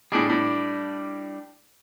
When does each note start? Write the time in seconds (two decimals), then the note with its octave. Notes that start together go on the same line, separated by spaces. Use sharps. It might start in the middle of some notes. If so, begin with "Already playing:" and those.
0.12 A2 G3 D4 G#4
0.29 A2